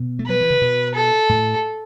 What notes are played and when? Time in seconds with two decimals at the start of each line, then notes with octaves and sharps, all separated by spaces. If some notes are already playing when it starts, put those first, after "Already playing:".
Already playing: B2
0.19 A3
0.26 F#3 B4
0.40 E3
0.50 C#3
0.62 B2
0.95 A4
1.29 A2